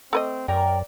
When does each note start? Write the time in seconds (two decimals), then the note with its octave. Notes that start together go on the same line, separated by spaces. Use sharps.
0.13 A3 C4 B4 D#5
0.48 F#2 A#4 D5 G5 A#5